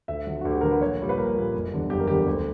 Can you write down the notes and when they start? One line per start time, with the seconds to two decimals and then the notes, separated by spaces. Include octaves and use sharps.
0.08 D2 E5
0.27 D3 F#3
0.41 D2 F#4
0.51 G4
0.61 D3 F#3 A#4
0.71 B4
0.81 A#1 C#5
0.99 A#2 G3
1.09 B4
1.18 A#1 A#4
1.36 A#2 G3
1.54 F#1
1.72 E2 D3 G3
1.90 F#1 G4
2.00 A#4
2.08 E2 D3 G3 G4
2.26 D2